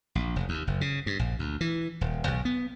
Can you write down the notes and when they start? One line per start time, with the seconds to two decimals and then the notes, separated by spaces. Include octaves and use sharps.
0.15 A#1
0.36 F1
0.49 D#2
0.67 F#1
0.81 C#3
1.06 G2
1.19 A#1
1.39 D2
1.61 E3
2.01 D#1
2.27 B1
2.45 B3